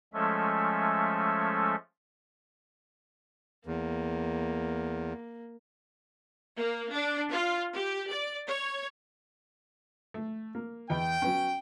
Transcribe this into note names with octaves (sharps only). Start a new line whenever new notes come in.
F3 G#3 A3 C#4 A4 E5
E2 A#3
A#3
D4
F4
G4
D5
C#5
A3
A#3
E2 D#5 G5 B5
F#3 B3 C#4